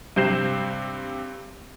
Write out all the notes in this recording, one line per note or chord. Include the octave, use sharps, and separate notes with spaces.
G2 C3 C4 G6 C7 E7